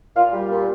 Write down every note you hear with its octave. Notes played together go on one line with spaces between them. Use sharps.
A#2 F4 F5
G3
A#2